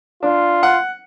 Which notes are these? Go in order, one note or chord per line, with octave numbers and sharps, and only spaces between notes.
D4 F4
F#5